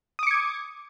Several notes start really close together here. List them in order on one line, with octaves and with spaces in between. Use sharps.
D#6 D6 C#7 G#6